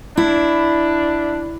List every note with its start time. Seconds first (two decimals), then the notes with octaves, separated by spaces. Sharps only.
0.17 D4 E4